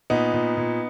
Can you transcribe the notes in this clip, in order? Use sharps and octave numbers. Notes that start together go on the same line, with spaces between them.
A#2 B3 D#4
A#2
A#2